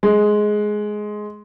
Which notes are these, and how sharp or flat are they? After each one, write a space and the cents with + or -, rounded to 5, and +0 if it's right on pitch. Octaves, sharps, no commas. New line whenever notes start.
G#3 +10